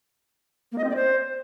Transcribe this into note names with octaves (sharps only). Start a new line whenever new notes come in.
A#3
D#5
C4
D5
C5